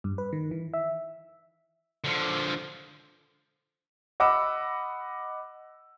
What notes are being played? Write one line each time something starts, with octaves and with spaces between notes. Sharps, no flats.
G2
B4
D#3
E3
E5
D3 F3
D#5 F#5 B5 D6 E6